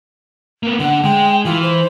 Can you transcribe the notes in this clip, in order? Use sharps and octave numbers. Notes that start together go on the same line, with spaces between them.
A#3 B3
D3 F#5
G#3 G5
E3 F4
C5